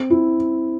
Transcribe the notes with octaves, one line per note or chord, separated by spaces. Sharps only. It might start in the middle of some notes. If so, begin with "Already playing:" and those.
Already playing: C4
E4